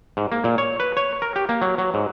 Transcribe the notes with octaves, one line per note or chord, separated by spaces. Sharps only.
G#2
A#3
A#2
C#5
B4
C#5
A#4
G4
A#3
F#3
F#3
G#2